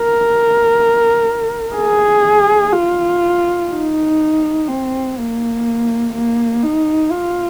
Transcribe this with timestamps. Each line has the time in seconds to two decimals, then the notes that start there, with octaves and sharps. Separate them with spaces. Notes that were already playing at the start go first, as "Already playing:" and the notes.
Already playing: A#4
1.75 G#4
2.73 F4
3.71 D#4
4.68 C4
5.17 A#3
6.14 A#3
6.63 D#4
7.11 F4